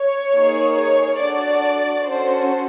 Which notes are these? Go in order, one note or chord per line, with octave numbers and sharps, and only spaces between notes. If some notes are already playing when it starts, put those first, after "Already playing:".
Already playing: C#5
A#3 D#4 G#4
C#5
D4 F#4 A4 D5
C#4 F#4 A4 C5